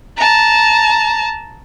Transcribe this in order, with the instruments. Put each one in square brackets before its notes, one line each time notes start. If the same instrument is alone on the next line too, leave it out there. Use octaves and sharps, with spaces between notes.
[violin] A5 A#5